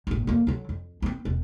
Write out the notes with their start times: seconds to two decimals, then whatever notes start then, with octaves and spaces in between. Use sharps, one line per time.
0.07 G1 A2
0.27 F2 A#3
0.47 D3 F#3
0.69 F2
1.02 B3 C4
1.25 E1 C4